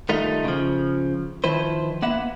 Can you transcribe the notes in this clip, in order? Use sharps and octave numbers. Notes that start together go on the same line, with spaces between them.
D#3 G3 A3 D#4 F4
C#3 F3
D#3 F3 E4 B4 C5
A#3 B3 E5 F#5